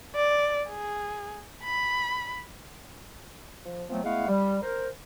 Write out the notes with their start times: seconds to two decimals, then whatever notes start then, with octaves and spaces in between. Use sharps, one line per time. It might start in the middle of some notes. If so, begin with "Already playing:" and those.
0.15 D5
0.69 G#4
1.64 B5
3.66 F3
3.90 F3 F#3 A3 B3 C4
4.04 G#3 A3 B3 E4 F5 F#5
4.28 G3
4.63 A#4 C5